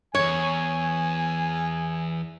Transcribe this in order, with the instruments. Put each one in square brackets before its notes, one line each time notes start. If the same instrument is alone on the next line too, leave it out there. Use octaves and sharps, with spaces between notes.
[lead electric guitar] E2 G2 [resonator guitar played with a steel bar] C#5 [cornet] G#5